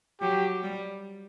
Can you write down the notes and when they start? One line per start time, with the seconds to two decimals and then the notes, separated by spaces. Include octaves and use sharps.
0.21 F#3 G4
0.63 G3